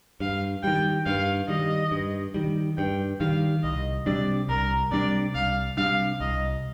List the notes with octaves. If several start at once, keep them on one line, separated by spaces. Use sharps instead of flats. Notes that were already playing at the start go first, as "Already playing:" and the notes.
G2 F5
D#3 G3 G5
G2 F5
D#3 G3 D#5
G2
D#3 G3
G2 G5
D#3 G3 F5
C2 D#5
C3 G3 D4 D5
C2 A#4
C3 G3 D4 D5
C2 F5
C3 G3 D4 F5
C2 D#5